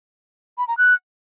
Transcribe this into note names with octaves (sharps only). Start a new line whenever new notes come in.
B5
A#5
F#6